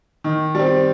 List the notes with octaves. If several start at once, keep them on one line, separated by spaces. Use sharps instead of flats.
D#3
G3 C4